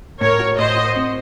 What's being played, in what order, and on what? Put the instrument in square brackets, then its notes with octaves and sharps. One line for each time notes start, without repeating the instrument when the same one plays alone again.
[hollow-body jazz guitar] A2 [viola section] A#4 C#5
[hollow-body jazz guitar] F#4
[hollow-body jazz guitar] A2 [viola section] C5 D#5
[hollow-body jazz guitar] F#4
C4